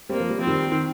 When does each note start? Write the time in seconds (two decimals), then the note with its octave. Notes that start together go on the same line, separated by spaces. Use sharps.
0.09 G3 A#3 C4
0.20 F3
0.30 G3
0.39 F3 C4
0.47 D#3 G3
0.72 D#3